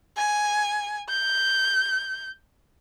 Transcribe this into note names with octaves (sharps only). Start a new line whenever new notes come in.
G#5
G6